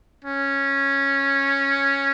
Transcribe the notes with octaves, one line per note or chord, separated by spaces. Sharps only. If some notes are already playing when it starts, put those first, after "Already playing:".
C#4